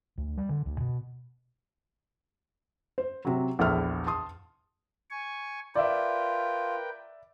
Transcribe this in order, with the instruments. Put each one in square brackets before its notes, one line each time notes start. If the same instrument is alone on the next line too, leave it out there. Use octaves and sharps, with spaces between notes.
[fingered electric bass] D2
G3
D3
D2
B2
[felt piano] C5
C3 F#3
A#1 E2 E4 A4 F6
A5 C6 D#6
[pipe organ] G#5 C#6
[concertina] F4 [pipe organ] A#4 B4 G5 [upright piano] D5 E5